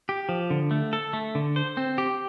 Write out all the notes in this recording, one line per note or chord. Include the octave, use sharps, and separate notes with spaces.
G4
F3
D3
A3
A4
A3
D3
C5
C4
G4